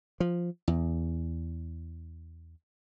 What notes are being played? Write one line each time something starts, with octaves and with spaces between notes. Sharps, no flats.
F3
E2